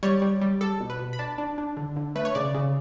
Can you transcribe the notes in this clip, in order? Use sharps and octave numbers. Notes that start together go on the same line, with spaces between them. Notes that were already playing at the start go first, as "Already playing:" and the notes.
G3 C#5
G3
G3
G3 A4
B2
B4
B2
B5
D4 A5
D4
D4
D3
D3
A3 B4
C#5
C#3 D5
C#3